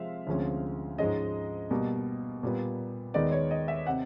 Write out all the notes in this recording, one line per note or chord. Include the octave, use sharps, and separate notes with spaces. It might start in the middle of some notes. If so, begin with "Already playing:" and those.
Already playing: C3 F3 G#3 C4 E5 F5
D2 C3 F3 G#3 C#4
G#2 F3 G#3 C#4 D#5
B2 G3 A#3
A#2 G3 B3
D#2 D#3 G#3 B3 D#4 D5
C#5
D#5
E5
C3 F#5